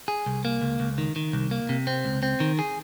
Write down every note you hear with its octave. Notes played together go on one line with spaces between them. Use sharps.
G#4
C2
A#3
C#2
C#2
D#3
D#3
C2
A#3
C3
C4
C#2
C4
D#3
G#4